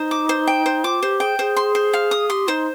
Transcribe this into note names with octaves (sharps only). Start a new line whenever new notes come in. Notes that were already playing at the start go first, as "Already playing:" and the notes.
Already playing: D#4 C5
D6
C5
G5
C5
F4 D6
G4 C5
G#4 G5
G#4 C5
C6
C5
F5
D#6
G4 C6
D#4 C5